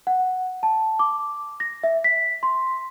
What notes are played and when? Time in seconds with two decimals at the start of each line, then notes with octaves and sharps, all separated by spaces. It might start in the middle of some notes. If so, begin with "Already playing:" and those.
0.07 F#5
0.63 A5
0.99 D6
1.60 A#6
1.83 E5
2.04 B6
2.43 C6